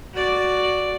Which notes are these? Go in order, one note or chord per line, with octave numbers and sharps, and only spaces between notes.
F#4 D5